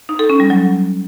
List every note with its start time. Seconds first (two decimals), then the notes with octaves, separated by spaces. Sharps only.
0.09 D#4
0.19 A4
0.30 C#4
0.40 G3
0.50 F#3